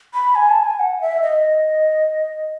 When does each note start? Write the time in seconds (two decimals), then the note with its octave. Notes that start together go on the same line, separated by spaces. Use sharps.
0.14 B5
0.35 G#5
0.50 A5
0.64 G#5
0.79 F#5
1.01 E5
1.22 D#5